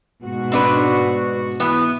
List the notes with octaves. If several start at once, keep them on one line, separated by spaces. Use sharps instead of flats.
G#2 B2 F#4
C4 D4 B4
E3 B3